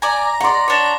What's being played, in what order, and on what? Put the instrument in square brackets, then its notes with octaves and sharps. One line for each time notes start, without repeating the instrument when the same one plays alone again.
[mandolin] D5 G#5 [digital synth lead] A#5
[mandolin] C#5 D5 [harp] F#5 C6
[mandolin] D4 C#5